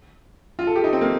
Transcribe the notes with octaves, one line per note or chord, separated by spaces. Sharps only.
F4
A4
G4
D#4
C4
A#3